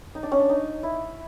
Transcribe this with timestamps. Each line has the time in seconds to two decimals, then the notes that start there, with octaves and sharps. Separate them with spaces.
0.15 D#4
0.23 D4
0.32 C#4
0.39 D4
0.50 D#4
0.83 E4